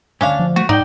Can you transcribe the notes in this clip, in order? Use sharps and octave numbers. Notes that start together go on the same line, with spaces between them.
D2 G#2 C#4 D4 F5
F3
A3 F#4
G#2 D#4 D5 F#5 G5